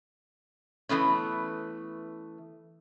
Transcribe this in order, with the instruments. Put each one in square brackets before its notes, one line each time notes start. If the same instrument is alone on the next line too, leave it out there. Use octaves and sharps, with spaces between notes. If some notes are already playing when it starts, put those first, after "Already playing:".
[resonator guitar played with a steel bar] E3 A3 B3 C#4